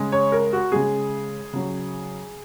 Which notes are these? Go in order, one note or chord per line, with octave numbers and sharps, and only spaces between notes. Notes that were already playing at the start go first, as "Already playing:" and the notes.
Already playing: C#3 G#3
C#5
A#4
F#4
C#3 G#3 G#4
C#3 F#3